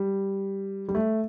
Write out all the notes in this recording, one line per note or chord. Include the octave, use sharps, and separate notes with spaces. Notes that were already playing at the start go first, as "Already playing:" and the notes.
Already playing: G3
G3
A3